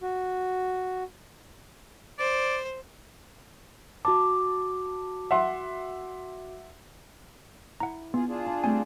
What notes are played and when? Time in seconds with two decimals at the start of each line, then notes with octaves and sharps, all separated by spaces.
0.01 F#4
2.19 C5 D5
4.05 F#4 A5 D6
5.31 E5 F#5 C6
7.80 E4 F#5 A#5
8.14 B3 F4 G#4
8.28 D4 F4 G#4
8.46 A5
8.64 G3 A3 C4 G#5